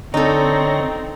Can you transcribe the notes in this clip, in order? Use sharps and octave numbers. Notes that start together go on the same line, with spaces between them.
D3 C4 D#4 A4 C#5 A#5